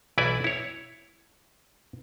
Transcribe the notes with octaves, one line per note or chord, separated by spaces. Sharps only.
B1 E3 E4 D5 G#5
E4 C#5